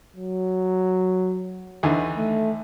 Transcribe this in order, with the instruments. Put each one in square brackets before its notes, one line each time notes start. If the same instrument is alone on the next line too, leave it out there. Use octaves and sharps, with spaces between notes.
[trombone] F#3
[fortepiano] D#2 D3 E3
[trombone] A3